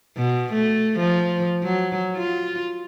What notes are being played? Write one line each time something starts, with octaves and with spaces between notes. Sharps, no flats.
B2
A3
F3
F#3
F4